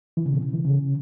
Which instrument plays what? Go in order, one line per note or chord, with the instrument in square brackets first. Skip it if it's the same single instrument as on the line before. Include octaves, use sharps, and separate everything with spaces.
[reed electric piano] E3
C#3
B2
C#3
E3
C#3